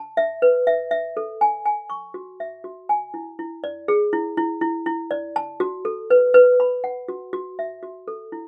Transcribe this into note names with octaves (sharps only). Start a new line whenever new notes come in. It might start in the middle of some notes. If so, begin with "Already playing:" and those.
Already playing: A5
E5
B4
E5
E5
A4
G#5
G#5
C#6
F#4
E5
F#4
G#5
E4
E4
D5
G#4
E4
E4
E4
E4
D5
A5
F#4
A4
B4
B4
B5
F#5
F#4
F#4
E5
F#4
A4
E4